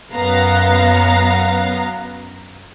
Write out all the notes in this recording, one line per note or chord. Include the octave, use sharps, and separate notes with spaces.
F#2 B3 F5 A#5